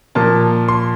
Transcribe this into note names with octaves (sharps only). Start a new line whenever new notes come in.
A#2 F3 A#3 A5
C6